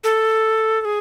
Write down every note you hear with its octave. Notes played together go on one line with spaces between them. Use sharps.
A4
A4
G#4